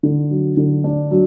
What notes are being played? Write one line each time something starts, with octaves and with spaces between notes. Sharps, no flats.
D3
F#3
D3
D4
F#3